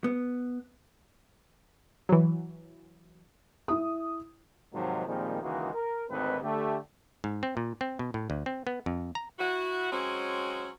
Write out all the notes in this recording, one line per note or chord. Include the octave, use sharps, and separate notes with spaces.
B3
E3 F#3
E4 D#6
G#2 C3 D#3 F3 F#3
A#2 D#3 F3 G3 G#3 C4
C#2 D#3 E3 G#3 A#3 F#4
A#4
G#1 D2 C4 D#4 B4
D3 A3 G4
G#2
C4
A#2
C4
B2
A2
D2
C4
B3
F2
A#5
E4 F#4
F#3 G#3 C4 C#4 F#4